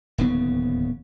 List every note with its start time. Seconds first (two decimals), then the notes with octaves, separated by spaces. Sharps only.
0.18 D1 D#2 C#3 B3